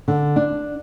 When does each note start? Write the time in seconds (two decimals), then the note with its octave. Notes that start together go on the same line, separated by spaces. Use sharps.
0.08 D3
0.36 D4